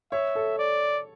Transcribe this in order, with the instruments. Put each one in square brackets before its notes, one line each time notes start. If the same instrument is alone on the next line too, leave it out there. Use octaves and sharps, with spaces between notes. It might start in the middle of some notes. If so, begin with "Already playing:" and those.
[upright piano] C#5 [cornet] E5
[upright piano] A4
[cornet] D5